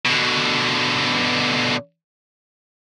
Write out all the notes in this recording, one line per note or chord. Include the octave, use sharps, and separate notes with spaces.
B2 D3